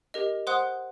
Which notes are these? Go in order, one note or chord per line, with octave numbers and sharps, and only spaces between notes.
G4 A#4 D#5
C5 F#5 C6 D#6 F#6